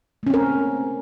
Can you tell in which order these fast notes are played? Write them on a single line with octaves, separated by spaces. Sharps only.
A3 C#4 C4 A#4